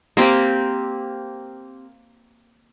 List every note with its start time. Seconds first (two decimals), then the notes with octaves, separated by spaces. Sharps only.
0.17 A#3 C4 G4